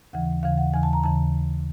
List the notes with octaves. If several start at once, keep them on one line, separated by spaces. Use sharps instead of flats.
D#2 C#3 E3 F#5
D#2 C#3 E3 F5
F#5
D#2 C#3 E3 G#5
A5
A#5
D#2 C#3 E3 A5